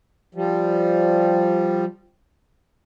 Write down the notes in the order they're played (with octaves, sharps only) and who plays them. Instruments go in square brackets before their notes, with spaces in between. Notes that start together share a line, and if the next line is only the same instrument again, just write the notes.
[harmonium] F3 G3